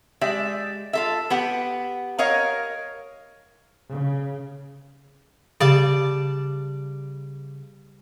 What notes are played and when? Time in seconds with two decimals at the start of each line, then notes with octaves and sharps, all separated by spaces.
0.21 G#3 G4 D5 E5
0.93 F4 A4 E5
1.30 B3 G4 F#5
2.19 A#4 C#5 D#5 F5
3.91 C#3
5.60 C#3 G3 D5 A5